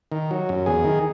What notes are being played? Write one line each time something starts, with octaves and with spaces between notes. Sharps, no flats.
D#3
F#3
F#2
E2 G#4
D#3